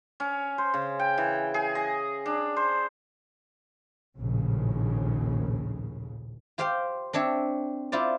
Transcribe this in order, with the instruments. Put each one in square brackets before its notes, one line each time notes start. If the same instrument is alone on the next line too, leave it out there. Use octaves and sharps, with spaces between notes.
[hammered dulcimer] C#4
C5
C#3
G5
E3
G#4
D#5
D4
C5
[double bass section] A#1 D#2 A2 C#3
[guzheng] F4 G4 C5 F5 G5
C4 D4 C#5 E5
E4 F4 C5 D5